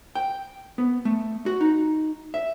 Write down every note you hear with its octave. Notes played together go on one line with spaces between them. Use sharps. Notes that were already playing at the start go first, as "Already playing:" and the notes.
G5
B3
A3
F#4
D#4
E5